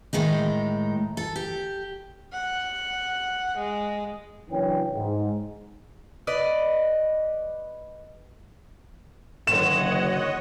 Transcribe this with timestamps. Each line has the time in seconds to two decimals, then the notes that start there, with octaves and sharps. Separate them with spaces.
0.13 A2 D#3 G#3 D#4
1.17 A4
1.36 G4
2.33 F#5
3.58 G#3
4.50 F#1 F#2 E3 D4 C#5 G5
4.95 G#2
6.27 B4 D5 D#5
9.47 F#1 D3 D#3 C#5 D#5 F#5 E7